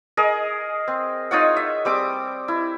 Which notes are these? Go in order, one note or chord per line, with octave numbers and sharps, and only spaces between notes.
G#4 A#4 D#5
C4
D#4 F4 C#5 F#5
E5
G3 C4 D6 D#6
E4